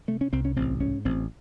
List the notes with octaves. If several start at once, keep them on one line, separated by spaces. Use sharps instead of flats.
C3 A3
C#4
C2 C4
C#4
A1 C4
G#2 C#4
A1 C4